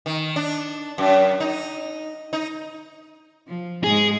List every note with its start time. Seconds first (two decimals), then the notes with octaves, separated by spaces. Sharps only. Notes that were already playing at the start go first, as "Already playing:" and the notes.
0.06 D#3
0.36 D4
0.98 F#2
1.40 D#4
2.33 D#4
3.48 F3
3.84 G#2 G#3 G#4